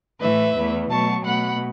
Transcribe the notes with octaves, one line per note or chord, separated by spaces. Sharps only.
A2 E3 A3 B4 E5
E2 E3 A3
B2 F#3 A3 A5 C#6
B2 A3 F#5 B5